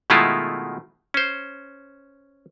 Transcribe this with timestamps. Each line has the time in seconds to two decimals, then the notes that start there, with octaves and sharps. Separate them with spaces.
0.10 B2 D#3 G#3 A3 E4 F4
1.14 C#4 C5